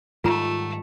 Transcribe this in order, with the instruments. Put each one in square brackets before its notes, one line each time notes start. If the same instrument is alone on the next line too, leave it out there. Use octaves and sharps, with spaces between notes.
[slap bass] G#2 D#3 G3 [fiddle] A3 [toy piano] F4 A#5